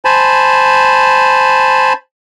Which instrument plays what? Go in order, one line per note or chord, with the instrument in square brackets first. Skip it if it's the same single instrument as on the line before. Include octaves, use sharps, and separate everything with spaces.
[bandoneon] C5 G#5 A5 B5